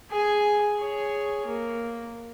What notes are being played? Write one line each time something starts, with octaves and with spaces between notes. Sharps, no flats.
G#4 G#5
G#4 C#5
A#3